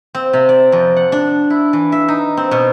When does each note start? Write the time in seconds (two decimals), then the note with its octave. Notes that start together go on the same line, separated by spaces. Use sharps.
0.15 C4
0.33 C3
0.49 D5
0.72 F2
0.96 F#5
1.12 D4
1.50 E4
1.73 E3
1.92 E5
2.08 D#4
2.37 C4
2.51 B2